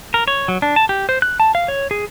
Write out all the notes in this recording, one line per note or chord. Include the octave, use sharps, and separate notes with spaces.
A#4
C#5
F#3
D4
A5
G4
C5
F#6
A5
F5
C#5
G#4